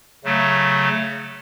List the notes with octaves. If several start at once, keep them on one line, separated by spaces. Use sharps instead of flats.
C#3 F#3 A3